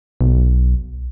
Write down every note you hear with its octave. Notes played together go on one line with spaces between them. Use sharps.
B1